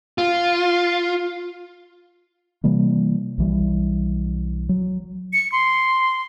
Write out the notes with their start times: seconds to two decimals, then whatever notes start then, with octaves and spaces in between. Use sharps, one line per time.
0.18 F4
2.64 C3 E3 G3 A#3
3.38 B1 E3 G3
4.69 F#3
5.33 C#7
5.52 C6